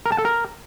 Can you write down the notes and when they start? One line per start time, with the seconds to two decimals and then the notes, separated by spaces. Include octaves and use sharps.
0.06 A#4
0.12 A5
0.18 A4
0.25 A#4